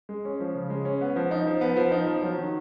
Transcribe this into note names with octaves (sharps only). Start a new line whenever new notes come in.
G#3
C#4
F3
C#3
G#3
C#4
B3
F3
D#4
F3
B3
F3
D#4
F3
F#3
D#3